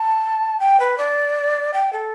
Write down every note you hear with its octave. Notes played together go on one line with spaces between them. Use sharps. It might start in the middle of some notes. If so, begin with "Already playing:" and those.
Already playing: A5
G5
B4
D5
G5
A4